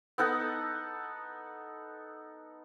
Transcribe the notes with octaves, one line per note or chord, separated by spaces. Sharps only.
B3 D#4 A4 F#5